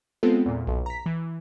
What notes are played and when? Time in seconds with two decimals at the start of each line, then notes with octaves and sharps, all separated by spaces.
0.23 G#3 B3 C4 F4 A4
0.45 E2 A#2
0.67 B1
0.86 A#5 B6
1.06 E3